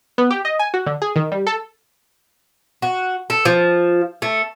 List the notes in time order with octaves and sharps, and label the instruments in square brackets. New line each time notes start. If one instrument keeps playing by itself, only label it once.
[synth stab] B3
G4
D#5
G#5
F#4
D3
G#4
D#3
G3
A4
[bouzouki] F#4
A4
F3
A3